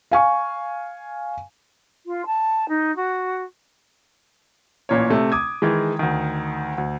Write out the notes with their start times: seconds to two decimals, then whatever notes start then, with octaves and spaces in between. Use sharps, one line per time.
0.11 F5 G#5 C#6
2.05 F4
2.26 A5
2.68 D#4
2.96 F#4
4.89 A1 A#2 C#4 C#5
5.10 C3 A3
5.32 D6 D#6 G#6
5.62 D#3 E3 G#3
5.99 D2 D#3
6.78 D2